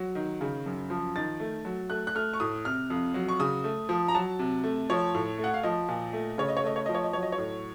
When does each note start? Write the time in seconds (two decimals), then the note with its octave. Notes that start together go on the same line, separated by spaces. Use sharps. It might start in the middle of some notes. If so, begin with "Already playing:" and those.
Already playing: F#3
0.15 D#3
0.41 C#3
0.66 F#2
0.90 F3
1.15 D#3 A6
1.40 A3
1.65 F#3
1.90 A3 F#6
2.07 F#6
2.15 A3 F6
2.33 C#6
2.40 A2 D#6
2.65 C3 F6
2.90 F2
3.14 F#3
3.29 C#6
3.40 C#3 D#6
3.64 A3
3.89 F3
4.08 A#5
4.15 F#3 A5
4.39 C3
4.64 A3
4.90 F3 C#5
5.15 A2
5.38 A3
5.44 F#5
5.54 F5
5.63 F3 D#5
5.89 A#2
6.13 A3
6.38 C#3 C#5
6.48 D#5
6.57 C#5
6.64 A3 D#5
6.76 C#5
6.86 F3 D#5
6.95 C#5
7.04 D#5
7.13 F#3 C#5
7.23 D#5
7.32 C#5
7.38 A2